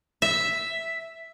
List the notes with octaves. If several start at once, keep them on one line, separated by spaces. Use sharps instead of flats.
E5